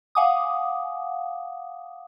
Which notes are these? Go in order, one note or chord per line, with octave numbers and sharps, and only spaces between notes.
F5 F#5 G#5 D6 D#6